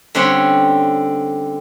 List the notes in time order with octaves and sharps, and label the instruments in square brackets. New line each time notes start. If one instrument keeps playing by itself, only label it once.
[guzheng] D3 G3 C4 C#4